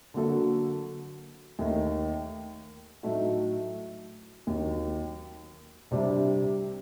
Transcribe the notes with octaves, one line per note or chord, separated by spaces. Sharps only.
D3 F#3 A#3 F#4 A4
D#2 D#3 A3
A2 F#3 A3 D#4 F#4
D#2 D#3 F#3
C2 C3 G3 D4